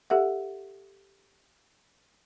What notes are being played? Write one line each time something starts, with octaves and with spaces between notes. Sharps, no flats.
G4 A4 E5 F#5